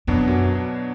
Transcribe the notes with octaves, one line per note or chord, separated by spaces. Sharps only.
F2 B2 F#3 B3 D4
F#2